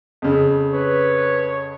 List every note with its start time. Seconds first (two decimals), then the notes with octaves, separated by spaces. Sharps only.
0.22 F2 C#3
0.73 B4 C#5